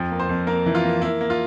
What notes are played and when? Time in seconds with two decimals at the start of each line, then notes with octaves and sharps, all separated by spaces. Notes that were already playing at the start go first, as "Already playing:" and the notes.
Already playing: F2 F3
0.11 A#3
0.20 C5
0.29 F2
0.47 A#3 A#4
0.66 E3
0.75 F4
0.84 A#3
1.02 A#3 E4
1.21 A#3
1.30 F4